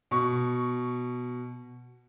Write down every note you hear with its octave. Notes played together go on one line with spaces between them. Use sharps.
B2 C#6